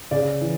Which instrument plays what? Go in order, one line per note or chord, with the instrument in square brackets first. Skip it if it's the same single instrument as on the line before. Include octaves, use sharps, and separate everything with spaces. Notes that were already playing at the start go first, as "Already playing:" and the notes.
[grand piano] C#3 D5
E3